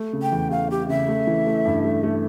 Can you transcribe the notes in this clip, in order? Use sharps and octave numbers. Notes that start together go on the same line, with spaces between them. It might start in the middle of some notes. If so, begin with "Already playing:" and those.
Already playing: A3
C#3
G5
E2
A3 F5
A3 G4
C#3 E5
A3
E3
A3
G2
A3
A3